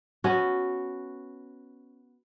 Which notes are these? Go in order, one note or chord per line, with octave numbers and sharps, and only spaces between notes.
B3 C#4 F#4